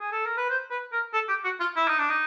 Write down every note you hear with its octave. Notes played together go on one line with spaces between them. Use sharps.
G#4
A4
A#4
B4
C5
B4
A#4
A4
G4
F#4
F4
E4
D#4
D4
D#4